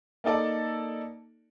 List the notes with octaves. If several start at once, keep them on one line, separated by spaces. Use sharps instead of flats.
A#3 D#4 A4 D5 A5